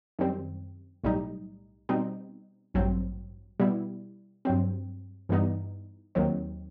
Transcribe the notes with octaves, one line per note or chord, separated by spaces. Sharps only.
F#2 D#3 G3 C4
B1 A2 G3 D#4
B2 G3 C4 D#4
A1 G2 F#3 C4
B2 G3 B3 E4
G2 F#3 C4
G2 E3 G3 B3 D#4
D#2 D#3 F#3 C4